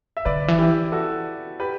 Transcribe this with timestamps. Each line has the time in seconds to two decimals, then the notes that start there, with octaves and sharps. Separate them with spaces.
0.17 E5
0.25 D3 B4 D5
0.48 E3
0.59 E4 G4
0.92 F#4 A4
1.60 G4 B4